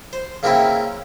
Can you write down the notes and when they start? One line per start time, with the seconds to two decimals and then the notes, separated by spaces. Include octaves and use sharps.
0.13 C5
0.43 C#3 A#3 C4 C#4 E4